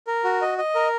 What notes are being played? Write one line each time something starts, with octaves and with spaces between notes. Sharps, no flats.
A#4
F#4
D#5
D#5
A#4